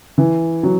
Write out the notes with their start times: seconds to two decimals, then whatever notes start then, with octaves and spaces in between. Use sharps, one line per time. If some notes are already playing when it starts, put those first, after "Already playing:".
0.18 E3
0.63 F#3